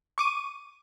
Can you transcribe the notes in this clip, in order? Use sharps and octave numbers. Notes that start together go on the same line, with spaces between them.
C#6 D6 D#7